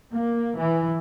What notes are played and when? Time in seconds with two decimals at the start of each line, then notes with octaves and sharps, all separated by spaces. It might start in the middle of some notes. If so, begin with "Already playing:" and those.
0.12 A#3
0.57 E3